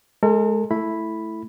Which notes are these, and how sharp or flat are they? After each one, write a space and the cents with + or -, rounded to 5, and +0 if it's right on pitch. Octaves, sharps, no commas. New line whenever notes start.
G#3 +25 A#4 -45
A3 +0 E4 +0 B5 +0